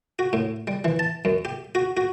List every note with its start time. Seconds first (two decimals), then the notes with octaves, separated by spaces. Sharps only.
0.19 F#4
0.33 A2
0.67 G3
0.85 E3
0.99 A5
1.25 F#2
1.45 G4
1.75 F#4
1.97 F#4